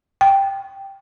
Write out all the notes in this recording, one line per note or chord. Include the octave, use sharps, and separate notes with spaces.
G5